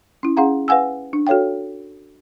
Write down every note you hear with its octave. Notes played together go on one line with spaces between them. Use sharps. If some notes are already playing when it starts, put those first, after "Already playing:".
C#4 E4
C#4 G#4 F5 F#5 A#5
B4 F5 F#5 G#5 E6
D4
F#4 A4 C#5 F5 G5